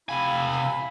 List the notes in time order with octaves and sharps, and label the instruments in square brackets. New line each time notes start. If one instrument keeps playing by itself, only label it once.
[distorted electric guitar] C3 G#5 [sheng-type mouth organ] E4 B5 [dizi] F5